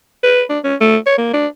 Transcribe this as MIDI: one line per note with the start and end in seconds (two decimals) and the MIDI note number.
0.23 0.42 71
0.50 0.59 62
0.64 0.75 61
0.81 0.97 57
1.06 1.18 73
1.18 1.31 58
1.33 1.47 62